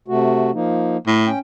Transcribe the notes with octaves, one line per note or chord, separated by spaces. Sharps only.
C3 A3 F#4
F3 A#3 D#4
A2
C#4 G5